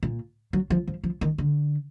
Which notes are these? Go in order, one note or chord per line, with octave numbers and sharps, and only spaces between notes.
A#2
F#3
F3
F3
F3
D#3
D3